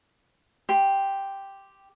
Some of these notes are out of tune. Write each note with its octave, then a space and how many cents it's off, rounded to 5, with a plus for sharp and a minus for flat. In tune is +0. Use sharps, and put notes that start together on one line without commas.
G4 +0 C6 +0